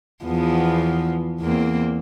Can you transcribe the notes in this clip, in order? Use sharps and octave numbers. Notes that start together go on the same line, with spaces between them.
E2 F3 B3
E2 A#3 C4